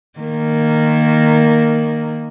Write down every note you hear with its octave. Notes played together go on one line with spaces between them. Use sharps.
D#3 A#3